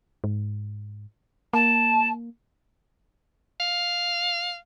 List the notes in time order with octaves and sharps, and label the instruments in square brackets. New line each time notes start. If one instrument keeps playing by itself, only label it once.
[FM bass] G#2
[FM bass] A#3 [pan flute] A5
[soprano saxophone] F5